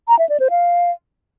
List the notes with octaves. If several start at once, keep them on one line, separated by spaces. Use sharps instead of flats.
A#5
E5
D5
C5
F5